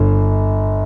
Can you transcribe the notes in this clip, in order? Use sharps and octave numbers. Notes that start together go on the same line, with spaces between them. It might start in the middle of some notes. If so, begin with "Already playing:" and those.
Already playing: G1